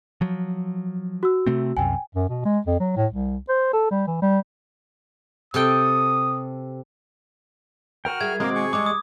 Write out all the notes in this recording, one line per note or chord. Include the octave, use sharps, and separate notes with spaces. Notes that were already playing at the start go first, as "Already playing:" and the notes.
F3 F#3
F#4 E6
C3 A3 C4
C2 F#2 C3 G5 G#5
F#2
B2
G#3
F2
F#3
A2
C2
C5
A4
G3
E3
G3
C3 A4 G5 D#6
F#4 A#4 G5 F6
G3 G#4 E5 G#6
B2 D#3 G#3 A#3 C4 F#4 A#4 D6
G#4 C#6
E2 G3 G#3 A4 D6
D#6